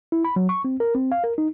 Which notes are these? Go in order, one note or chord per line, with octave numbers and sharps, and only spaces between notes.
E4
B5
F#3
C#6
C4
A#4
C4
F5
A#4
D#4